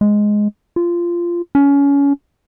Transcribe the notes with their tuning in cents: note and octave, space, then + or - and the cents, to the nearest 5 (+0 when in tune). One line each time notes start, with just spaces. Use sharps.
G#3 +5
F4 -15
C#4 +25